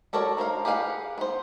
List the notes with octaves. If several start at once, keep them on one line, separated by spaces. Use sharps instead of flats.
F#4 A4 A#4 C#5 D5
A4 A#4 C5 F5
G4 G#4 B4 F5 F#5
B3 C5